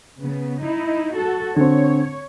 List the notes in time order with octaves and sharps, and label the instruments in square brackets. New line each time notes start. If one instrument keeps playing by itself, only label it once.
[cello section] C#3 B3
D#4 E4
F#4 A4
[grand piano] D3 C4 [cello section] C#5